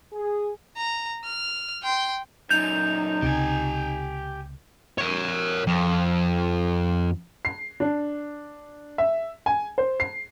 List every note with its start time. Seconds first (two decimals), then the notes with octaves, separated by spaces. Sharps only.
0.13 G#4
0.76 A#5
1.24 F6
1.83 G5 C6
2.51 F#2 A#2 D#4 G6 F7
3.22 C#2 C3 G4 G#5
4.98 A#4 C#5
5.67 F2
7.45 C7
7.80 D4
8.98 E5
9.46 G#5
9.78 C5
10.00 C7